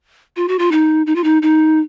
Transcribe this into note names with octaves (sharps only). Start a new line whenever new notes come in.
F4
F#4
F4
D#4
D#4
F4
D#4
D#4